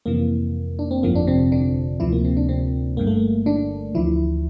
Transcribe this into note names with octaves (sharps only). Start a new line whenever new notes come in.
F2 C3 E3 A#3
D4
C4
G1 F2 D3 F3 A#3
D4
C3 C4
D3 D4
D2 C3 E3 F3 E4
A#3
C3 C4
D3 D4
C3 C4
G1 G2 D3 A#3
A3
A#3
D3 D4
D2 D3 E3 F3 E4